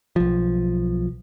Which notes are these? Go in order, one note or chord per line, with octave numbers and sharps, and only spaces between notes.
B1 F3